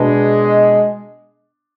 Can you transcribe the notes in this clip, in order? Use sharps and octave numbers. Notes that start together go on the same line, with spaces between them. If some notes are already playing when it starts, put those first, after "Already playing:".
Already playing: B2 G#3 B3 D4